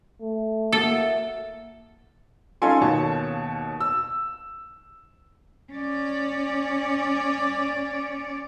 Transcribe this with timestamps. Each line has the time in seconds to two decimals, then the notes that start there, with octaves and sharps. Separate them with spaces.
0.22 A3
0.72 A#3 E4 F#4 A4
2.62 C#4 D#4 F4 A4 G#5 C6
2.81 D#2 B2 C#5 A5
3.81 E6
5.72 C#4 D5